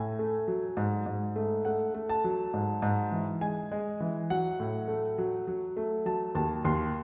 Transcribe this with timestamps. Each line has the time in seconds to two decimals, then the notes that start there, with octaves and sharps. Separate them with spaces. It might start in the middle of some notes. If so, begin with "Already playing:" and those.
Already playing: A2 G#5
0.19 A3
0.48 F#3
0.77 G#2
1.06 G#2
1.36 A3
1.65 A3 F#5
1.94 A3
2.09 A5
2.24 F#3
2.54 G#2
2.82 G#2
3.12 E3
3.41 G#3 G#5
3.72 G#3
4.00 E3
4.30 F#3 F#5
4.60 A2
4.88 A3
5.18 F#3
5.47 F#3
5.77 A3
6.06 F#3 A5
6.35 D#2 A5
6.65 D#2 C6